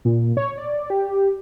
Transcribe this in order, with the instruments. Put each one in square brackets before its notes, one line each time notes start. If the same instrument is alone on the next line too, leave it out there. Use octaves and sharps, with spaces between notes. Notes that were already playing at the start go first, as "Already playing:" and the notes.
[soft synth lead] A#2
C#5
D5
G4